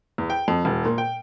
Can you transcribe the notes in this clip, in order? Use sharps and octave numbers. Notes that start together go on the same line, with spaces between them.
E2
G5
F2
E1
A#2
G5